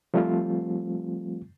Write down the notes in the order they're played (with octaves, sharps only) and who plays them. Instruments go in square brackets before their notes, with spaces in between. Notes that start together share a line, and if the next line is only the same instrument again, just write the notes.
[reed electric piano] F3 G3 A3 C4 F4